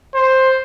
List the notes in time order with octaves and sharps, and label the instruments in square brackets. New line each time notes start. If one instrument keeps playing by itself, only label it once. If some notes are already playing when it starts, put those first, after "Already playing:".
[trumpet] C5